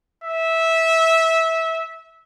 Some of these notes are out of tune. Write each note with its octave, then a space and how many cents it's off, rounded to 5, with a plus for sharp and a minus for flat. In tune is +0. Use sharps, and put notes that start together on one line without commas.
E5 -15